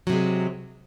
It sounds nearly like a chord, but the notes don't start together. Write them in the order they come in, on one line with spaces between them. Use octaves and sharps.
F#3 C3 G#3